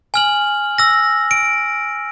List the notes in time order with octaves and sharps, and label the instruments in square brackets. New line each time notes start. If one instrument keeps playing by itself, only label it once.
[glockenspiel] G#5 F6 F#7
E6 A#6
D7